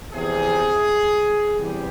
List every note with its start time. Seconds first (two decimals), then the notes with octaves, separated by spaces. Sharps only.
0.13 E2 C3 F3 G#4
1.56 E2 C3 E3 G3 G4